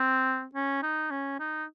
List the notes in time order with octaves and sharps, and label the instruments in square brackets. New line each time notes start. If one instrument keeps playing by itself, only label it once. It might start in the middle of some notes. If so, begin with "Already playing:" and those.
Already playing: [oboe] C4
C#4
D#4
C#4
D#4